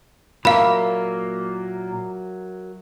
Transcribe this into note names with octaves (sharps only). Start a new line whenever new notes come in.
A#2 F#3 A#3 A#4 E5 F5 B5